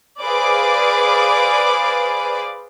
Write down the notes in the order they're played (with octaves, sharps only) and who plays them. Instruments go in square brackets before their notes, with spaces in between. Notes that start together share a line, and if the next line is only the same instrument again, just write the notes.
[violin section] G#4 B4 C5 D5 F5 D6